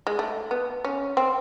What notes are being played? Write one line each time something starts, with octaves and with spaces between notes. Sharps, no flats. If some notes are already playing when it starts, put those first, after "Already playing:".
G#3
A3
B3
C#4
C4